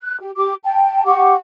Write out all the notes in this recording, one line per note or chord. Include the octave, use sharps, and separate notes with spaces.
F#6
G4
G4 D6
G5 A5
G4 F#5 C#6 D6